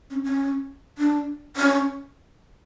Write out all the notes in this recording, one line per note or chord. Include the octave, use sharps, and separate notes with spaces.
C#4
C#4
D4
C#4